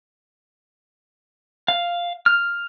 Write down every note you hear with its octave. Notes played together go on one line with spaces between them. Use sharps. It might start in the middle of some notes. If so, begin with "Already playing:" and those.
F5
F6